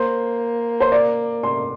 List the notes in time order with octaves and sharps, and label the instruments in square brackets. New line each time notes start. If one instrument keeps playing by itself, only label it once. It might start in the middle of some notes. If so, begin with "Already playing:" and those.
Already playing: [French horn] A#3 [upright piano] C5
[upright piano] C5
D5
C6